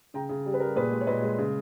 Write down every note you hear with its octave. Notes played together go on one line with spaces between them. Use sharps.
C#3 G5 A#5
C#3
G3
B4
G3 A#4
A#2 G#4 B4
G#3
C#5
A#2 B4 D#5
G#3
C#3